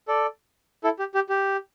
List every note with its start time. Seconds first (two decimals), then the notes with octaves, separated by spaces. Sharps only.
0.08 A4 D5
0.84 E4 A4
0.99 G4
1.15 G4
1.29 G4